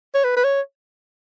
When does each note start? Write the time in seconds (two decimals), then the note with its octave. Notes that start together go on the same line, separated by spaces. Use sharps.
0.15 C#5
0.24 B4
0.37 B4
0.44 C#5